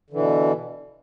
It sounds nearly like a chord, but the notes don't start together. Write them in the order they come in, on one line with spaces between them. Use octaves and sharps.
D3 E3 B2